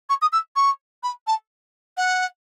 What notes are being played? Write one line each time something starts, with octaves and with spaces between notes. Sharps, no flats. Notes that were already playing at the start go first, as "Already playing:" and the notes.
C#6
D#6
E6
C#6
B5
A5
F#5